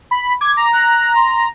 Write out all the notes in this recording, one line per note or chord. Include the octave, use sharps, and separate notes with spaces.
B5
D6 G#6
A#5
F#6
C6